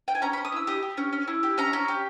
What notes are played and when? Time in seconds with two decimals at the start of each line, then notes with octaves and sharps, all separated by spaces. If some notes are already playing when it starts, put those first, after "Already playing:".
0.08 G5
0.15 G#5
0.22 C#4 A#5
0.33 B5
0.37 C#4
0.45 D#6
0.52 E4 E6
0.67 G4 D#6
0.83 G4
0.97 C#4
1.13 C#4
1.28 E4
1.43 G4
1.58 C#4 A#5
1.73 C#4
1.88 G4